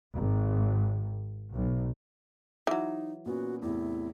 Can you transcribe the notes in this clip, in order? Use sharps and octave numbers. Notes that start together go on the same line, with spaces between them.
G#1
B1
E3 F#3 D#4
A#2 B3 C#4 F#4
E2 A2 C3 E4